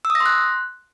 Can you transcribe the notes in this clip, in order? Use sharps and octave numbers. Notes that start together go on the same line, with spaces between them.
E6
D#6
A#6
C6
F#6